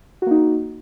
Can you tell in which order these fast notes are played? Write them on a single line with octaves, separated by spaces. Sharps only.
F#4 A#3 D#4